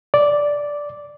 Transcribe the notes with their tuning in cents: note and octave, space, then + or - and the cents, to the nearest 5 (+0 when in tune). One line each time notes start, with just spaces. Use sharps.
D5 -5